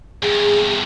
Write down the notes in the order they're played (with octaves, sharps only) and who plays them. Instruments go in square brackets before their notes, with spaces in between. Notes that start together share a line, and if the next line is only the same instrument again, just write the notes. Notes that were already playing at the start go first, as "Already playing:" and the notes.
[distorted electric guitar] E2 G2 [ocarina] G#4